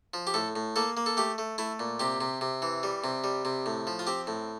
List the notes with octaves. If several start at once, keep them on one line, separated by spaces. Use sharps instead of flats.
F3
G4
A2 A4
A2
A#3 A4
A#3
A4
A3 G4
A3
A3 E4
A#2
C3 G4
C3
C3
E3
G3
C3
G3
C3
A2
F3
F4
C4 G4
A2